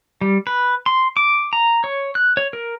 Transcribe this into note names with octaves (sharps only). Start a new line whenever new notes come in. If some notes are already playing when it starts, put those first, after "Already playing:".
G3
B4
C6
D6
A#5
C#5
F#6
C#5
A#4